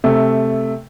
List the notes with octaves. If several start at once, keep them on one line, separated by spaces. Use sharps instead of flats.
C3 A3